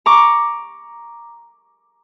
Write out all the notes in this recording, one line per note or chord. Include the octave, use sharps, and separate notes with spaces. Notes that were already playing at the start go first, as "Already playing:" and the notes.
A#5 C#6 D6